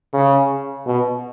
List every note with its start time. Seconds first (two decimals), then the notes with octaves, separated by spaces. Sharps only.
0.13 C#3
0.87 B2